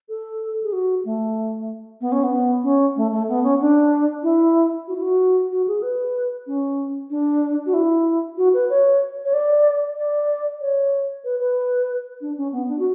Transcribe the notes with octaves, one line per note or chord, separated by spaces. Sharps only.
A4
G#4
F#4
A3
B3
C#4
B3
C#4
A3
A3
B3
C#4
D4
E4
F#4
E4
F#4
F#4
G#4
B4
C#4
D4
F#4
E4
F#4
B4
C#5
C#5
D5
D5
C#5
B4
B4
D4
C#4
B3
D4
F#4